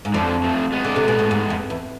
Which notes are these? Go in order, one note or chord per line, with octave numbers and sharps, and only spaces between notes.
G#2
F2 D3 F3
F3 A3
G#3 B3
D3
C3
B2
A2
G#2
F2
E2